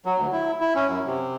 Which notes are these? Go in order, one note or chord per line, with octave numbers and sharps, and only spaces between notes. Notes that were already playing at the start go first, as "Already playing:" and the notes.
F#3
D2
E4
E4
C#4
F#2
C3